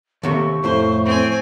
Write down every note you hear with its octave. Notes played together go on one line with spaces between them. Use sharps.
D#2 C3 A3 C#6
F2 A2 A3 C5 C6
C4 G#5